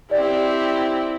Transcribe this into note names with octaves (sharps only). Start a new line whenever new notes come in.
C4 E4 G4 D5